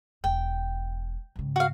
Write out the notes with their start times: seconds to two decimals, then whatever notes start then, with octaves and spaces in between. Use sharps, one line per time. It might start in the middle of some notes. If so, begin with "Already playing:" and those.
0.24 E1 G5
1.36 G#2 C#3
1.56 F#4 F5